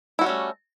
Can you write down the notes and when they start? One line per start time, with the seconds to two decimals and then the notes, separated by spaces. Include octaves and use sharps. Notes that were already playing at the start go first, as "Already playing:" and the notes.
0.19 E4
0.21 F#4
0.24 G3
0.26 C#4
0.29 A3